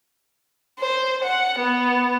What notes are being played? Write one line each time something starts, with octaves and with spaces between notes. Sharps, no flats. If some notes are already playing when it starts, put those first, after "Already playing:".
C5
F#5
B3